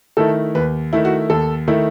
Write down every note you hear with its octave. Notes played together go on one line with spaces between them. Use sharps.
D#3 A3 E4 A4
D#2 B4
D#3 A3 E4
F#4
D#2 A4
D#3 A3 E4